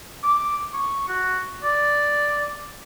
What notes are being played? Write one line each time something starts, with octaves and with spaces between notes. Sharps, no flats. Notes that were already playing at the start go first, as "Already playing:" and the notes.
D6
C#6
F#4
D5